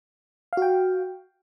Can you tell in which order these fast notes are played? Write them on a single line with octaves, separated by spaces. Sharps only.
F5 F#4 G5